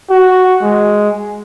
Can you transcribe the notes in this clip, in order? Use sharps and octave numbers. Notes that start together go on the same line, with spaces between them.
F#4
G#3